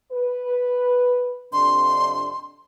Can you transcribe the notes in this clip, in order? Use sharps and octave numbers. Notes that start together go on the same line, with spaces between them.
B4
F2 C3 D4 C6